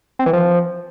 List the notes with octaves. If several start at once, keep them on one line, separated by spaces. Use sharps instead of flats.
C4
E3
F3